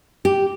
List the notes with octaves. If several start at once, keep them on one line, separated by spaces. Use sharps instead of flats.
G4